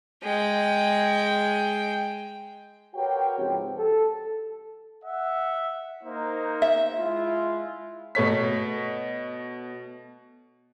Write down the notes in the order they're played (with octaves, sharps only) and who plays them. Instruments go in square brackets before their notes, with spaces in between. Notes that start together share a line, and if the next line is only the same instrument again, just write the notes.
[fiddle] G#3 G5
[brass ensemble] F#4 G4 A#4 B4 C#5 G5
G#2 C#3 F3 C4 G4
A4
[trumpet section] E5 F#5
A#3 D#4 C5
[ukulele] E5
[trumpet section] G#3 E4 F4
[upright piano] B2 A3 C#5 B6